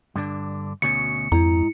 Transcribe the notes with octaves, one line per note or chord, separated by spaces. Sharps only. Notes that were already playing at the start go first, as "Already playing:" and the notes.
G2 D3 D4
D2 B2 C#4 C#7
F2 G#2 E4 A#5